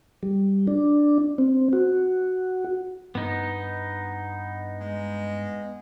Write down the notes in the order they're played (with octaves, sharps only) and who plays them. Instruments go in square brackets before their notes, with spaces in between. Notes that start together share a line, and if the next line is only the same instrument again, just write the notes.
[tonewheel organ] G3
D4
C4
F#4
[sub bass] G2 [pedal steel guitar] B3 D#4
[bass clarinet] G#3